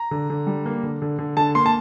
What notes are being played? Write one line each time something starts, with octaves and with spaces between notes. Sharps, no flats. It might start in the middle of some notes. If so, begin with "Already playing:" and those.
Already playing: A#5
D3
D3
G3
A#3
D3
D3
D3
D3 A5
A#3 C6
A5